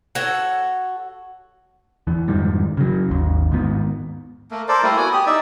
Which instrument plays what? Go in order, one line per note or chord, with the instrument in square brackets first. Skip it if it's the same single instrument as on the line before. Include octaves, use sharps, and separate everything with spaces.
[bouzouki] F#4 A4 C#5
[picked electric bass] E2 E3
F2 G#2 D#3 G3
C#3 F#3
G#1 D#2
G#2 D#3 B3
[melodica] A3 A#3
A4 A#4 C5 D5
G3 A3 A#3 E4
B3 F#4 G#5
G4 D#6
D#4 D5 E5